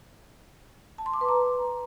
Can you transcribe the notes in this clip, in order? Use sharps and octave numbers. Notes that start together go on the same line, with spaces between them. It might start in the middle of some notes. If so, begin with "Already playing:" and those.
A5
C6
D6
B4
A#5